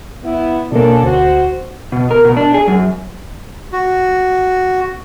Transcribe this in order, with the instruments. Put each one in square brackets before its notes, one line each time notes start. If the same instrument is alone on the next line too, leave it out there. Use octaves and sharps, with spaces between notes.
[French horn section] B3 E4
[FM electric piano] B2 A#3 [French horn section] C#4 D4 A4
[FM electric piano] D2 [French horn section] F#4 C5
[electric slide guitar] B2
A#4
B2
D4
G#4
F#2
[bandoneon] F#4